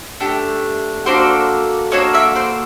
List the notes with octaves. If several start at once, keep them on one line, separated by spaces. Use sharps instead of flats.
A3 D4 G4
A#3 D4 F#4 A4 C5 D5
A#3 D4 F#4 A4 C#5 D#5
D5 E5
C5 D5